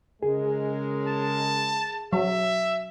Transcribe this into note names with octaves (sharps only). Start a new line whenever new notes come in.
C#3 G#3 G#4 A#4
A5
F#3 E5